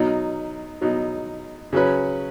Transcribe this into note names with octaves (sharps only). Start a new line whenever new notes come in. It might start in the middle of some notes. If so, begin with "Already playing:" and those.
Already playing: B2 F#3 D#4
B2 F#3 D#4
C#3 F#3 C#4 B4